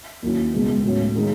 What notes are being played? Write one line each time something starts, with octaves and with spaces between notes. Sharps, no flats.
D#2 D#3 F#3 C#4 E4
C#2 B2 G#3 B3
A2 F#3 C#4
D#3 G#3 D#4